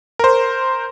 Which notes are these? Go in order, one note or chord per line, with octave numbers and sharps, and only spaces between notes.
A#4 C5